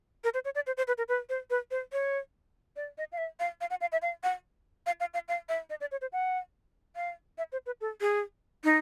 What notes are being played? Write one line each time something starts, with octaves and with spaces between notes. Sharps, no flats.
A#4
C5
C#5
D5
C5
C5
B4
A#4
B4
C5
B4
C5
C#5
D5
D#5
F5
E5
F5
F5
F#5
F5
E5
F5
F#5
F5
F5
F5
F5
E5
D#5
D5
C#5
C5
F#5
F5
E5
C5
B4
A4
G#4
D#4